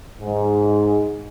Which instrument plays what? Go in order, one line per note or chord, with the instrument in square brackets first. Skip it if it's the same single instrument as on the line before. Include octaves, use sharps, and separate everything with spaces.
[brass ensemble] G#2